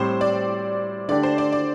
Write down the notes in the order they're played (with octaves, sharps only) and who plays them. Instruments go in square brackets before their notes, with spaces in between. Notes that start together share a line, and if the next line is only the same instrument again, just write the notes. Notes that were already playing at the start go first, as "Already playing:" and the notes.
Already playing: [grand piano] A2 G3 C4 [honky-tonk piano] C5
[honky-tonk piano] D5
[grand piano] D3 A3 D4 G4 [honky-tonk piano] D5
[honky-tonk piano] C5
D5
D5